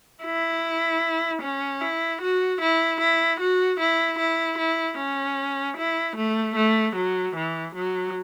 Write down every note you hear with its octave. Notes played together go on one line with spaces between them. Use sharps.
E4
C#4
E4
F#4
E4
E4
F#4
E4
E4
E4
C#4
E4
A3
A3
F#3
E3
F#3